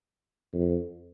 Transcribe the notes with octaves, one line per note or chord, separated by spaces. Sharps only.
F2